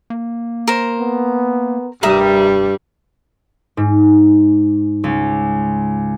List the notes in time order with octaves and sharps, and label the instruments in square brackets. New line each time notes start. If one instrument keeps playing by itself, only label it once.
[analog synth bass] A#3
[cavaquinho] A#4 C5
[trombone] B3
[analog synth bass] F1 [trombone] G2 [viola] G3 [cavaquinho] A#4 E5 D#6
[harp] G#2
C#2